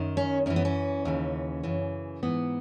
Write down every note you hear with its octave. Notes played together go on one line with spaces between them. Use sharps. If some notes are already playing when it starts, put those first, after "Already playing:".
Already playing: F#2 D#3
C#4
F#2 E3 C#4
B3
C#4
D#2 C#3 E3
F#2 C#3 E3
G#2 E3 B3